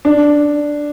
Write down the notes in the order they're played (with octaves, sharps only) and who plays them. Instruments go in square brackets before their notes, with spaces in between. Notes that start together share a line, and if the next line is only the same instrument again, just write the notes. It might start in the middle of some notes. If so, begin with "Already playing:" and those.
[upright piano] D4